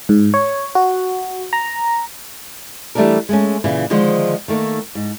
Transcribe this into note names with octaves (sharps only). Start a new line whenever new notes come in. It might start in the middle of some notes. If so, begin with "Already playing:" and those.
G#2
C#5
F#4
A#5
E3 G3 A3 A#3 D4 A#4
G#3 A3 C#4
A#2 C#3 E3
D3 D#3 F3 G#3 C5
D#3 A3 A#3 D#4
G#2